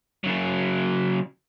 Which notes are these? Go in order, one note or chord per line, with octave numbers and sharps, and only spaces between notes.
C#3 F#3